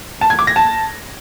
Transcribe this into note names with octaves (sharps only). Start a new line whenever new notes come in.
A5
G#6
D6
A#6
A5